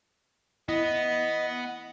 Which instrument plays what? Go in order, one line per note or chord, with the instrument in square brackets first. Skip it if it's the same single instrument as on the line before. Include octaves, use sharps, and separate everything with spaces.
[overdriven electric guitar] B3 [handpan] E4 [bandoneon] D#5